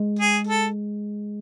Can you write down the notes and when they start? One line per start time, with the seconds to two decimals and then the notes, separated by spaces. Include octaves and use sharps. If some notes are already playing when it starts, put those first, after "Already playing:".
Already playing: G#3
0.19 G#4
0.47 A4